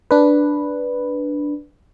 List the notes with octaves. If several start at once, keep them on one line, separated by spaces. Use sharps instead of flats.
D4 B4